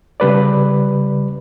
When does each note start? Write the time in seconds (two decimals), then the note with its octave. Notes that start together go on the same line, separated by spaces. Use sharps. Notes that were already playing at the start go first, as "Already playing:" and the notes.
0.20 C#3 G3 B4 D5